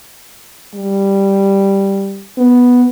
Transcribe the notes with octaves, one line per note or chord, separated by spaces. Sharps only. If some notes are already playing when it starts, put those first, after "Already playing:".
G3
B3